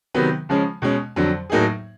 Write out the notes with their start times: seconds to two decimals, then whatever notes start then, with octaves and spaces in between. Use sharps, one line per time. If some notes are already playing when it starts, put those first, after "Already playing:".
0.14 C3 D#3 F#3 B3
0.49 C#3 F3 G#3 C#4
0.82 B2 G#3 C#4
1.16 F2 D3 F#3
1.50 A2 F#3 A#3 D#4 G#4